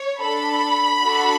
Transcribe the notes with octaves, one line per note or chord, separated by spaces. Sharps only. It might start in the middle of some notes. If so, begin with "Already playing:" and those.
Already playing: C#5
D4 A4 B5
D4 F#4 A4